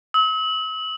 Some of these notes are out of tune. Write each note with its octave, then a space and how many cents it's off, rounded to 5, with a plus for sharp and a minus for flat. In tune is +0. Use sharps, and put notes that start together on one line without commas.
E6 -45